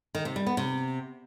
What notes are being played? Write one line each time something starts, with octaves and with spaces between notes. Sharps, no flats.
D#3
C3
G3
B3
C3